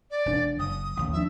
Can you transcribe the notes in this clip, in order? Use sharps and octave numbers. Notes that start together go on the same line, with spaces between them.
D5
E1 D4
F#1 D#6
A1 D#2
F3 B3 D4 E5